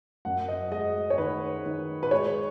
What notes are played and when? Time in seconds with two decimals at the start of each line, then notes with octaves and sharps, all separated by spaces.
0.25 F#2 F#5
0.48 D#5
0.72 G#3 D#5
1.10 C#5
1.18 D#3 B4
1.66 D#3
2.03 B4
2.11 G#3 C#5